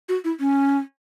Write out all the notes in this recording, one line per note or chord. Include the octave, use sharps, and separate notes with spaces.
F#4
E4
C#4